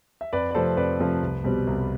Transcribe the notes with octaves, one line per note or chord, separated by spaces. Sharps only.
E5
F2 B4 D5
D5
C3 F3 A3 C4 A4 C5
F2 B4 D5
C3 F3 A3 C4
C2
B2 G3 C4
C2